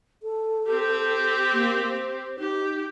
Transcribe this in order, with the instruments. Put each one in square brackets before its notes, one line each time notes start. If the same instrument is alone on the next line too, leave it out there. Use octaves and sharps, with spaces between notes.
[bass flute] A4
[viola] C4 G4
[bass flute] A#3
C5
[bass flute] D#4 [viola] G4